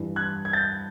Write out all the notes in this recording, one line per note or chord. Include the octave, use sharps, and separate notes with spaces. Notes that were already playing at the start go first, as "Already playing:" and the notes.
Already playing: G2 E3
F#6 G#6
G#6
G6 A6